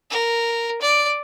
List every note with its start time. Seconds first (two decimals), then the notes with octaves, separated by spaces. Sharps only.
0.10 A#4
0.81 D5